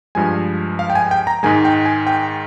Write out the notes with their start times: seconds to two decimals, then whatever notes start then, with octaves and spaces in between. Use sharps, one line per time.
0.15 G2 F3 G#3 G#5
0.79 F5
0.90 G5
0.95 G#5
1.11 G5
1.27 A#5
1.43 G#2 D#3 G#3 G#5
1.65 G5
1.85 G#5
2.07 G5